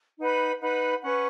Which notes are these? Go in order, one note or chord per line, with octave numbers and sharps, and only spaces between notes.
D#4 B4 F#5 B5
D#4 B4 F#5 B5
C#4 B4 F#5 C#6